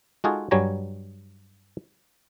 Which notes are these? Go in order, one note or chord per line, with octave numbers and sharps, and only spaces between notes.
G#3 D#4 F4 F#4 G#4 A4
G2 F#3 G3 C#5 G#5 A#5